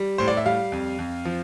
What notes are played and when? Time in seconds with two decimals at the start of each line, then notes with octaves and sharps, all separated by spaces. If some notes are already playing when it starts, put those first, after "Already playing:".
Already playing: G3
0.18 A2 C5
0.28 D5
0.37 E5
0.46 G3 F5
0.72 F2
0.99 F2
1.25 F3